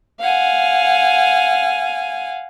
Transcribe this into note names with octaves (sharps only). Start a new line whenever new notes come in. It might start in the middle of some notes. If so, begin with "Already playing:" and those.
F5 F#5 G#5